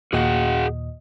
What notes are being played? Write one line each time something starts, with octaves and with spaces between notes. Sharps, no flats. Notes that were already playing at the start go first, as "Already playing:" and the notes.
D#2 A#2 F#4 G#4 D#5 F#5